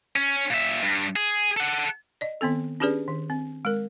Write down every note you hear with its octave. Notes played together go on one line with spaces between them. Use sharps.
C#4
A#2 E5
G2
G#4
A4 F#5
D5 D#5
D#3 B3 C4 A4
C#4 D4 G4 G#4 B4 D5
D#3
C4
G#3 A#4